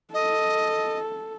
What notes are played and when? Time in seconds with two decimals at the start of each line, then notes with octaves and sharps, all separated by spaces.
0.14 A4 D#5